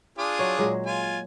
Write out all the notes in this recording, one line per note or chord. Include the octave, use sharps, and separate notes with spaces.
D4 F4 G#4
F#3 C#5
A#2 F#3 G#3
F4 G#5